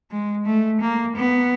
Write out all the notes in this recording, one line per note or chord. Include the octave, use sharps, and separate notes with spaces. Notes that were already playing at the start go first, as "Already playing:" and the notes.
G#3
A3
A#3
B3